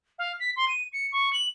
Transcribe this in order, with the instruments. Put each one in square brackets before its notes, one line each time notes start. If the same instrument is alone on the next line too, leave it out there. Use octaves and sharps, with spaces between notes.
[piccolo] F5
B6
C6
D#7
C#7
C#6
F#7